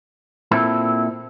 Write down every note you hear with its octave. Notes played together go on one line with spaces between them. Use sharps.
A#2 C4 E4 A4